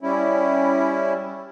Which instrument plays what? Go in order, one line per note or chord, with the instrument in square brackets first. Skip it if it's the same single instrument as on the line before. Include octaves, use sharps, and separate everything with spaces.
[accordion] G3 C#4 E4